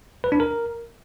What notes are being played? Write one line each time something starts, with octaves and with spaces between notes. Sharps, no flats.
B4
D4
A#4